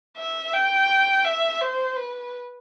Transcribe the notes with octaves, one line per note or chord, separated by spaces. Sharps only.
E5
G5
E5
C5
B4